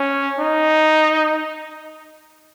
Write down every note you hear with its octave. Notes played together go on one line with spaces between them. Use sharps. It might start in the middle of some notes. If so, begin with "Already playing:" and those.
Already playing: C#4
D#4